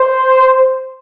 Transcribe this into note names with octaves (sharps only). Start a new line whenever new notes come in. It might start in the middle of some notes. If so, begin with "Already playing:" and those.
Already playing: C5